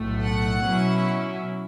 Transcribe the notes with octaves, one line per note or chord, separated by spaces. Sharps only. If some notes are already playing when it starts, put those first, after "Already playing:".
Already playing: B1 A2 A3
F#5
B2 F#3 C#4 E4